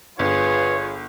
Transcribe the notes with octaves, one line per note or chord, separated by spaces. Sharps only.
G1 F4 G#4 B4 C#5